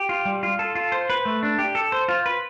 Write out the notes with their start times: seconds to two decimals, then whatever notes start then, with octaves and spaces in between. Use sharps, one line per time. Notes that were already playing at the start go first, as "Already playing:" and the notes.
Already playing: G4
0.09 F4
0.25 G3
0.43 F4
0.59 A4
0.75 F4
0.92 C5
1.10 B4
1.25 A3
1.43 D4
1.59 G4
1.75 A4
1.92 C5
2.08 F4
2.26 B4